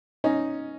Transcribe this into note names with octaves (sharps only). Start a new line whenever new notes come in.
C#4 D#4